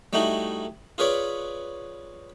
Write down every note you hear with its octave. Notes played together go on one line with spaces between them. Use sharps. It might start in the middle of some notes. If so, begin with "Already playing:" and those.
G3 A3 D#4 E4 F#4
F4 G#4 B4 C#5 D5